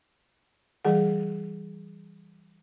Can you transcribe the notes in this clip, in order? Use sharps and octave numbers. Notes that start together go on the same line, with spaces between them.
E3 G3 G#4 F#5